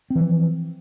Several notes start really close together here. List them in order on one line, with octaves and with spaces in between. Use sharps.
C4 E3 F3